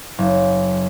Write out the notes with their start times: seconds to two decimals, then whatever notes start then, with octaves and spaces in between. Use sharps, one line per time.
0.18 F#1